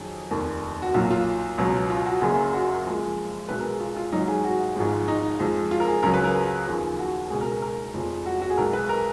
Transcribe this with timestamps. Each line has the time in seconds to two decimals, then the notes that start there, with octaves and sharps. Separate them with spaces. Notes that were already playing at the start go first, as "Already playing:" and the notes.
Already playing: F2 D#3 F#3 G#4
0.31 F1 D#2 D#3
0.82 F#4
0.94 B1 A#2 F#3 F4
1.11 F4
1.58 C#2 B2 F#3
1.90 F4
2.06 F#4
2.21 F#1 F#2 C#3 F#3 G#4
2.53 F#4
2.85 F2 F3 G#3
3.49 B1 B2 G#3 B4
3.59 A#4
3.70 G#4
3.80 F4
3.96 F4
4.12 G#1 G#2 F#3 D#4
4.28 G#4
4.44 F#4
4.76 G#1 G#2 F3 G#3
5.08 D#4
5.39 F2 F3 G#3
5.71 F4
5.80 A#4
5.87 G#4
6.03 C#2 C#3 F#3 A#4
6.14 B4
6.24 A#4
6.67 D#2 C#3 F3
6.99 F#4
7.30 C#2 B2 G#3 G#4
7.41 A#4
7.52 A#4
7.62 A#4
7.94 F1 F2 F3 G#3
8.26 F#4
8.42 F#4
8.50 G#4
8.57 B1 B2 G#3 A#4
8.73 B4
8.89 A#4